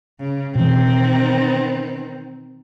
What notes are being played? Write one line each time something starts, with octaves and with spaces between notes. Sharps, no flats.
C#3
B2 D#3 E3 C4